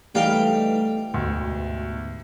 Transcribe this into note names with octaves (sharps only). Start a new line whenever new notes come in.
E3 G3 A3 B3 D#4 G4 F5 G5
D2 G#2 B2